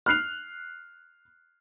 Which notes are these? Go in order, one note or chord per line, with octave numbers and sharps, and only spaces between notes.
F6 F#6 C7 F7